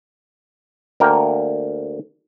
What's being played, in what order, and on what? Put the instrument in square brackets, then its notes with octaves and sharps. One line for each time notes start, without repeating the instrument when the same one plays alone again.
[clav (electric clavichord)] D2 A#3 A#4 G5